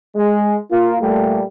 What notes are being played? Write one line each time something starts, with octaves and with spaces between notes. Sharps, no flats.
G#3
A#3 F4
A#2 G3 A3